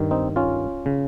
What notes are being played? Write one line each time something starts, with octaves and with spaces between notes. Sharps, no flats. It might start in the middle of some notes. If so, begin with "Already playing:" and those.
Already playing: G2 D#3
C4 D#4
C#4 F4
C#3